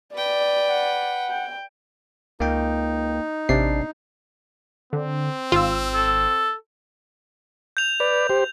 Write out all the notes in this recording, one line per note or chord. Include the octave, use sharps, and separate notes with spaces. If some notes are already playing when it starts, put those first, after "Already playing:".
B4 D5 G5
F#5
G5
C#2 A#3 D#4 G5
A1 C3 D4 D5 C7
D3 C4
G#1 F4 E6
A4
G6 F7
B4 D5
G4 C5